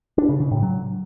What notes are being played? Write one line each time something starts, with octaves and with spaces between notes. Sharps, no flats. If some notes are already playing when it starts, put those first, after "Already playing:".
D4
C#3
C#3
A2
F#3